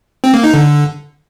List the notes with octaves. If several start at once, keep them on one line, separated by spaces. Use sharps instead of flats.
C4
A#3
D#4
D3